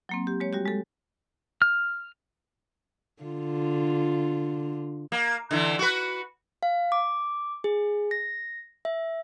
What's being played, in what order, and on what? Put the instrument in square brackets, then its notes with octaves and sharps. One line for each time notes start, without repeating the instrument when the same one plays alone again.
[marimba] F#3 A#3 C4
G4
G#3 C#5
G3 F#4 G4
G#3 A4
[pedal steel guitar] F6
[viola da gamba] D3 F4
[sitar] A#3
D3 E3
F#4 B4
[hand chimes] F5
D6
G#4
A#6
E5